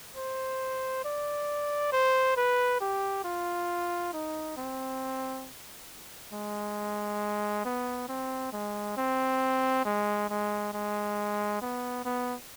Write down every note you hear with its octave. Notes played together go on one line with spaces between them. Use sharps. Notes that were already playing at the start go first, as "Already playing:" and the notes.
C5
D5
C5
B4
G4
F4
D#4
C4
G#3
B3
C4
G#3
C4
G#3
G#3
G#3
B3
B3